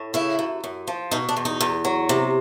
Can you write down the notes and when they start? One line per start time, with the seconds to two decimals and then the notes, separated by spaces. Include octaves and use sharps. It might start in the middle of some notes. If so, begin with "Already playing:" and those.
Already playing: A2
0.14 C#3 E4
0.39 F#2
0.64 F#2
0.88 F3
1.11 B2 D#4
1.29 D4
1.37 E2
1.45 D#4
1.60 E2
1.85 F#3
2.09 C3